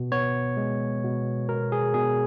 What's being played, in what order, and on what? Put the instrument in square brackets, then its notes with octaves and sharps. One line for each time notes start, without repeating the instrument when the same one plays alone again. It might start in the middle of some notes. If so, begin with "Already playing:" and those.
Already playing: [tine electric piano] B2
B3 C#5
G#3
B2
B2 A#4
G#4
B2 G#4